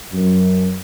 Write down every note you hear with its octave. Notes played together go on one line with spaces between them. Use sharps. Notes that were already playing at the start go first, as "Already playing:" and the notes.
F#2